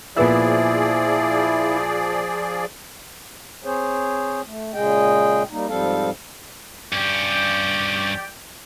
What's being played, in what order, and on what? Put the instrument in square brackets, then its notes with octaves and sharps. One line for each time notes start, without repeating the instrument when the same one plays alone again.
[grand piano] A#2 B3 E5 [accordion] F3 G#4 D5 [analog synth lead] E4
[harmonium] C4 G#4 C5 C#5
A3
A#2 C#3 G#3 G#4 D#5 G5
G3 A#3 D#4
G#2 F3 G3 C4 A4 F5
[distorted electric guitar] G2 C#4 [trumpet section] G4 D5 G5